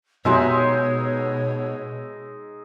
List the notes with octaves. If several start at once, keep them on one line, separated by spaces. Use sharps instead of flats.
B2 G#3 B3 D#4 F#4 G4 C#5 E5